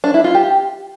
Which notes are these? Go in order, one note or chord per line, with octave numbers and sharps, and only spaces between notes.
D4
E4
F4
G4